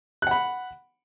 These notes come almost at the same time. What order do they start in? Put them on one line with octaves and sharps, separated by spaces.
F#6 F#5 B5